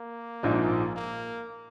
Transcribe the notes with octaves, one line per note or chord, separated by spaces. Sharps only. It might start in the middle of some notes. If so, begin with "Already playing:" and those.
Already playing: A#3
A#1 G#2 F3 G#3
A#3